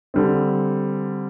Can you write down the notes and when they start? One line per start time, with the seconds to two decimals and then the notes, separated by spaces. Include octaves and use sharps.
0.14 D3 G3 C4